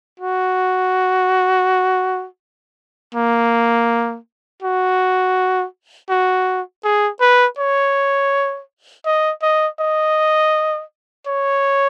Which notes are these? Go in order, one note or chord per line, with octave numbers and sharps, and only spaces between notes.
F#4
A#3
F#4
F#4
G#4
B4
C#5
D#5
D#5
D#5
C#5